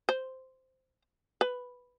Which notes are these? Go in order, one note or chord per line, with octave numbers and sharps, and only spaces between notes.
C5
B4